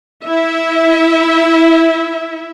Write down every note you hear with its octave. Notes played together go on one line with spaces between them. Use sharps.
E4 E5